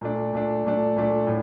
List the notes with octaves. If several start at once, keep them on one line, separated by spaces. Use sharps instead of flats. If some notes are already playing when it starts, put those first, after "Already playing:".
A#2 A3 D4
A#2 A3 D4
A#2 A3 D4
A#2 A3 D4
A2